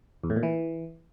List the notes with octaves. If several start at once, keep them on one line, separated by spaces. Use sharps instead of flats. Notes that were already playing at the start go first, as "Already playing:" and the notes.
E2
A2
A#2
E3